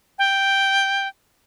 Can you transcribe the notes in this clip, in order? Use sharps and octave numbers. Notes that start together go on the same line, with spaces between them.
G5